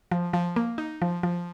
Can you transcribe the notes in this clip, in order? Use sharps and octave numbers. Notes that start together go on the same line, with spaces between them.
F3
F3
A#3
D#4
F3
F3